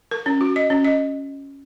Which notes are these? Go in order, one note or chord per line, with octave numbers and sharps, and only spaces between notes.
A#4
C#4
F#4
D#5
C#4
D#5